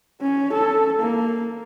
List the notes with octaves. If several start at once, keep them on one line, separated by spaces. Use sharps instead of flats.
C#4
A4
A#3